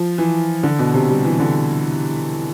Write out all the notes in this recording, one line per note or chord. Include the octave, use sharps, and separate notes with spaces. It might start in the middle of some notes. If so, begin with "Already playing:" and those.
Already playing: F3
E3
D3
B2
C3
G3
E3
D3